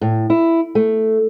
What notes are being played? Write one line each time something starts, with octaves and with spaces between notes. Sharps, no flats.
A2
E4
A3